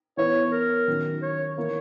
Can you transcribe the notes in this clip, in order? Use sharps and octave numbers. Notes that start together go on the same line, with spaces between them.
E3 B3 E4 B4 C#5
A#4
D#3 F#3 C#4
C#5
E3 A#3 E4 A#4 C#5